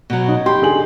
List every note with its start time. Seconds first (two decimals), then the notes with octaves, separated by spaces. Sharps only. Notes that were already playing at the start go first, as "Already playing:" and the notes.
0.10 B2 F#3
0.28 D#4
0.46 G4 B5 C6
0.62 D3 G#4 F#7